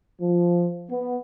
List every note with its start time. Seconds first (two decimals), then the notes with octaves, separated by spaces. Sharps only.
0.20 F3
0.89 B3